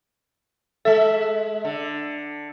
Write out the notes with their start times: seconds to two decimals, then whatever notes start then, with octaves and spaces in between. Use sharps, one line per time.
0.85 G#3 A4 E5
1.65 D3